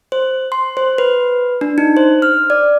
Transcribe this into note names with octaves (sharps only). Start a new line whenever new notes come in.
C5
C6
C5
B4
D4
D#4
C5
F6
D5